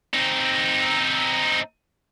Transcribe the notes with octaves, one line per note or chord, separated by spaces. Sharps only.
C4 D#4